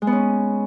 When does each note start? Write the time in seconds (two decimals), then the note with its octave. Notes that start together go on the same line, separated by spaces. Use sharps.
0.02 G#3
0.07 B3
0.12 C#4